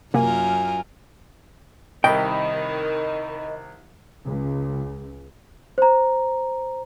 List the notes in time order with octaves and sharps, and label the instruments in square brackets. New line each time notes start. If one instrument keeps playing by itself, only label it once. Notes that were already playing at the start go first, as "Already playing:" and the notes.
[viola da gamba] F#2 F4 A#4 [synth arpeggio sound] C3 A#3 [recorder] G#5
[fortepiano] C2 [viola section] D#3 [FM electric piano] D#5 B5 [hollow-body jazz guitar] G5
[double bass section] C#2
[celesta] C5 A#5